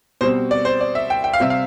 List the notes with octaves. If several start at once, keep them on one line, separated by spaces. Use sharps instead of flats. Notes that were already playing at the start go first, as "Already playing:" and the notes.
B2 G3 C4 C5
D5
C5
D5
E5
G5
G5
F5
C3 G3 C4 E5
F5